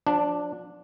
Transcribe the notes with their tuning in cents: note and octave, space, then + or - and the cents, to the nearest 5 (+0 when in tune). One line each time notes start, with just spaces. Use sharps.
F3 +40 D4 +0